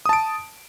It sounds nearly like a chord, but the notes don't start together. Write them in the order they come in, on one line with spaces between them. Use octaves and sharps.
D#6 A5 D7